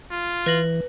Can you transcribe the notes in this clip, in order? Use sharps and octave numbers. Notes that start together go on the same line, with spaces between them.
F4
E3 B4 A#6 F#7